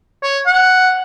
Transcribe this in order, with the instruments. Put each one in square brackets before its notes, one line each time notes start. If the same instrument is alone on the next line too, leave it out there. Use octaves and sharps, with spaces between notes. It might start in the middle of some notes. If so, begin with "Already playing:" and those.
[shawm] C#5
F#5